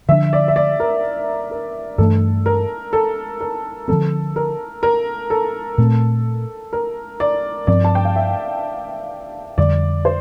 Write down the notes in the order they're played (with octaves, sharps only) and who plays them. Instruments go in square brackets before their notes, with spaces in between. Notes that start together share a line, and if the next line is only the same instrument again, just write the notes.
[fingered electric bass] D3 F3 A3 D4 [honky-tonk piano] E5
[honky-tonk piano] D5
E5
D5
A#4
A#4
[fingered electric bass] G2 E3 A3 D4 [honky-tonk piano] A4
[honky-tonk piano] A#4
A4
A#4
[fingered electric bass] D3 F3 A3 C4 [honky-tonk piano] A4
[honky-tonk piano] A#4
A#4
A4
[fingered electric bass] A#2 A3 C4
[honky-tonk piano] A#4
D5
[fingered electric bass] G2 F3 C4 [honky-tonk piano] D5
[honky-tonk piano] A5
G5
F5
E5
[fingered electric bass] F2 D3 G3 [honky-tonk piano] D5
[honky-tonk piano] C5